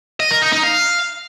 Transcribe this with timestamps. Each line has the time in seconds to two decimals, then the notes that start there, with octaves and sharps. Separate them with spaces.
0.20 D#5
0.31 A#4
0.42 D#4
0.52 D#4
0.63 F5